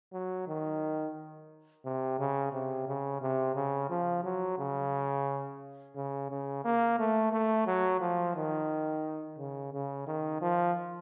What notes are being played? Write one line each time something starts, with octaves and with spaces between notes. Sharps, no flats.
F#3
D#3
C3
C#3
C3
C#3
C3
C#3
F3
F#3
C#3
C#3
C#3
A#3
A3
A3
F#3
F3
D#3
C#3
C#3
D#3
F3